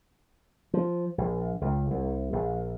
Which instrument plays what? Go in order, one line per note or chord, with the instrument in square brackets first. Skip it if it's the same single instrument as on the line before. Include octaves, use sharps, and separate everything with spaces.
[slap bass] F3
A#1
C#2
C2
A#1